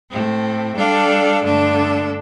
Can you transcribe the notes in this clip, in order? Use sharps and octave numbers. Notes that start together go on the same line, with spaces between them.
A2 A3 C4
G3 D4 A4 D5 F5
G2 D3 A3 D4 A4